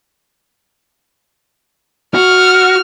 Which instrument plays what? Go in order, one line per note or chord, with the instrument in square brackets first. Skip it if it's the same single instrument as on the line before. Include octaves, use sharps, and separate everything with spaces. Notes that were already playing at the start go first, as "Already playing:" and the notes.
[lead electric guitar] F#4 [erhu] F6